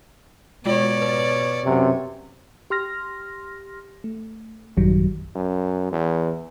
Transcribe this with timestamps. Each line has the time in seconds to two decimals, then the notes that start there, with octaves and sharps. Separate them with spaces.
0.66 B2 G#3 F4 C#5 D5
1.02 B4 A6
1.64 F#2 C3
2.70 G4 C6 F6 A#6
4.04 A3
4.77 A1 F#2 D#3 F#3 G3
5.35 F#2
5.92 E2